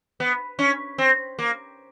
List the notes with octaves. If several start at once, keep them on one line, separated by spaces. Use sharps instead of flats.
B3
C#4
C4
A#3